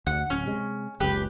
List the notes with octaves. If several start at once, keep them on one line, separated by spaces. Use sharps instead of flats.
D2 F#5
D1 C#4
C3 G#3
F#1 C#2 G4 B4